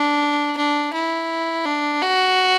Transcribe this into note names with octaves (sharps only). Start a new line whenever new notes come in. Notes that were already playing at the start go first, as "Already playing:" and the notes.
Already playing: D4
D4
E4
D4
F#4